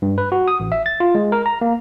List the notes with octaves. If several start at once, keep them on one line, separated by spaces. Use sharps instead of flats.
G2
B4
F#4
D#6
A1
E5
A6
F4
G#3
A#4
A#5
A#3